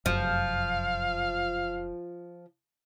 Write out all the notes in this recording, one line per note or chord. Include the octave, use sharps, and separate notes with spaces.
F1 F#2 F3 F5